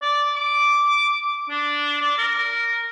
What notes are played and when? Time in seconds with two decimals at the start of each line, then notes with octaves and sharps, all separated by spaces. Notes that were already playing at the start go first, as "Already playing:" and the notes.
0.02 D5
0.36 D6
1.50 D4
2.01 D5
2.18 A#4